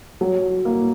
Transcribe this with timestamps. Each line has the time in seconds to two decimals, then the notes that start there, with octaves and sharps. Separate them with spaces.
0.21 F#3
0.65 A#3